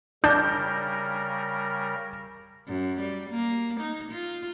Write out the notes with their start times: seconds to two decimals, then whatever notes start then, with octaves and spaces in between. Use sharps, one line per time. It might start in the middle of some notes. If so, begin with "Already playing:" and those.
0.24 C#3 G3 D4 A#4 G6
2.68 F#2
3.00 G3
3.30 A#3
3.81 D#4
4.12 F4